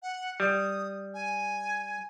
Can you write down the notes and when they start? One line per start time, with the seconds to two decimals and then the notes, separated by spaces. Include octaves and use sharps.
0.03 F#5
0.40 G3 D#6
1.14 G#5